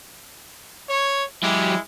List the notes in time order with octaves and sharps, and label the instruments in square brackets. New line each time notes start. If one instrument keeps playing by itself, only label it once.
[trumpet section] C#5
[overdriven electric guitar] F#3 G4 [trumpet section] G#3 E4